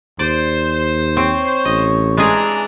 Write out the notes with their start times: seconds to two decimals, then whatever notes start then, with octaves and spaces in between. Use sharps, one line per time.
0.19 D#2 C5 D5
1.17 C4 C#5
1.65 A1 D#5
2.17 E3 G#3 D4 G#4 A#5